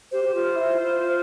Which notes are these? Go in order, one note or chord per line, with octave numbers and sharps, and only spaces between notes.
G4 C5
G4
F4
E4
F4